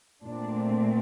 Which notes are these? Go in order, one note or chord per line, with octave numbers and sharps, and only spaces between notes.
A#2 A3 C4 D4